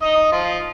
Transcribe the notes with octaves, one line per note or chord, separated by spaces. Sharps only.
D#4 D#5
F3 F4